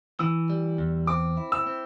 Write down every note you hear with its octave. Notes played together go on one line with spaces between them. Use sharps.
E3 E6
G3
E2
C4 D6
E4
E6
C4